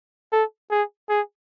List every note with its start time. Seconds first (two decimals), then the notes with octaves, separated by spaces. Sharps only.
0.32 A4
0.71 G#4
1.09 G#4